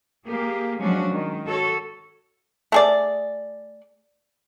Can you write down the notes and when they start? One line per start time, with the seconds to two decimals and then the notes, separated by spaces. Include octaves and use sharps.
0.24 A#3 G4 G#4
0.79 F3 F#3 G#3 C#4 D4 F#4
1.09 D#3 G#3
1.46 F#4 A4 C#5
2.72 A3 G#4 D5